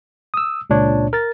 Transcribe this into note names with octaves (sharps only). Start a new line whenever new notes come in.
D#6 E6
C#2 A#2 D4 C#5
A#4 A6